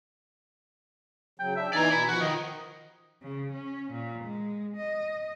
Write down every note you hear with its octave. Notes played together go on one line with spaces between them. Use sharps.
C#3 F#3 G5
D4 E5
E3 D#4 D5 G#5 A#5
B2 E4
F3 F#4
D#3 D#5
C#3
C#4
A#2
G#3
D#5